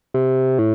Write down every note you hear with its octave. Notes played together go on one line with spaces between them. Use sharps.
C3
A2